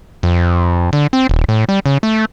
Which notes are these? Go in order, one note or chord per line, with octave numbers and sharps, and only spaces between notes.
F2
D3
C4
D#1
A2
G3
C#3
A3